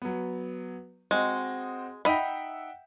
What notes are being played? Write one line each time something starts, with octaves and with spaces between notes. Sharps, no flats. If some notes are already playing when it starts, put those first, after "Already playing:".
F#3 B3
G#3 C4 F#4 D#5
D#4 E5 F#5 G5 B5